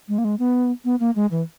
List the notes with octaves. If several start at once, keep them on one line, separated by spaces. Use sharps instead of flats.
G#3
A#3
G#3
B3
B3
A#3
G#3
E3